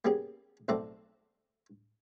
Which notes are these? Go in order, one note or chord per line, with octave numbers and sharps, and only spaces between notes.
A#3 B3 C#4 G4 G#4
B1 A3 C4 A4 D5 A#5